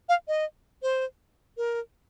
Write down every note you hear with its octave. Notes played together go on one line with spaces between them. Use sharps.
F5
D#5
C5
A#4